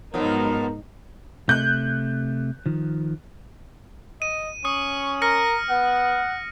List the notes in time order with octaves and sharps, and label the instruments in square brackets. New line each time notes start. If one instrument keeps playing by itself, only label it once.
[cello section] G#2 D#4 [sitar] B2 F3 F#3 [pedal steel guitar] B3 [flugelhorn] A#4
[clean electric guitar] C3 A3 [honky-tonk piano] F#6 G6
[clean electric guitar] D#3 F3
[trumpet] D#5 [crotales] D#7
[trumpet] C#4 [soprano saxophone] C#6 [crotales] D#6
[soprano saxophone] A#4 [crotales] F6 A#6 C#7
[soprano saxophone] B3 [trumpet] F#5